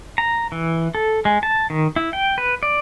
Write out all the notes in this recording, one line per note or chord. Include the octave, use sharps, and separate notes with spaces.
A#5
E3
A4
G#3
A5
D#3
E4
G5
B4
D5